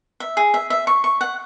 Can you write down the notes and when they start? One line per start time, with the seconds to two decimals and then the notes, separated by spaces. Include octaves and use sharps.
0.20 E5
0.37 G#4
0.54 E5
0.70 E5
0.87 C#6
1.04 C#6
1.21 F#5